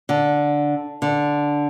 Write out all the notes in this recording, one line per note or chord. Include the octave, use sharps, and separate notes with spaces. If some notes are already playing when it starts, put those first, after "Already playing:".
D3
D3